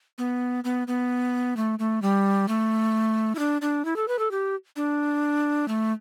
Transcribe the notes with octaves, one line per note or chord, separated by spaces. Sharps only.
B3
B3
B3
A3
A3
G3
A3
E4
D4
D4
E4
A4
B4
A4
G4
D4
A3